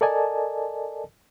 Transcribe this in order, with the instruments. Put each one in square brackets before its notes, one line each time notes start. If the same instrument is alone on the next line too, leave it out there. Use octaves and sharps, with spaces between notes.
[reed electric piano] A4 A#4 D5 D#5 G#5 A5